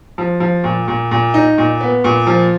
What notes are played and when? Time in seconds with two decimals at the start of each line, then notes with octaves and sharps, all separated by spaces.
0.18 F3
0.40 F3
0.64 A#2
0.88 A#2
1.11 A#2
1.34 D#4
1.58 A#2
1.81 B3
2.04 A#2
2.27 F3